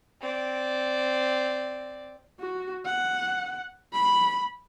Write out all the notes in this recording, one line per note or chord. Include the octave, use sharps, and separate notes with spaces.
C4 D5
F#4
F#5
B5